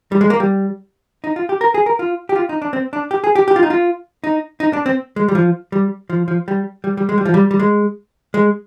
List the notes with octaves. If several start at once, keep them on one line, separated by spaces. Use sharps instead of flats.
G3
G#3
A#3
G3
D#4
F4
G4
A#4
G#4
A#4
F4
G4
F4
D#4
D4
C4
D4
G4
G#4
G4
G4
F4
D#4
F4
D#4
D#4
D4
C4
G#3
G3
F3
G3
F3
F3
G3
G3
G3
G#3
G3
F3
G3
G3
G#3
G#3